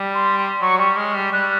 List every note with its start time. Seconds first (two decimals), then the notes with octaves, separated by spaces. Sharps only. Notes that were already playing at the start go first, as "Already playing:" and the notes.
Already playing: G3
0.14 C6
0.38 C6
0.61 F#3 C#6
0.79 G3 C#6
0.96 G#3 F6
1.15 G3
1.32 G3 F#6